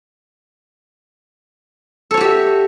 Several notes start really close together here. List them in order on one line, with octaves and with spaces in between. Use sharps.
A4 C#5 F#4 G4 E5